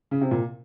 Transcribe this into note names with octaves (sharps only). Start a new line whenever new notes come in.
C#3
C3
A#2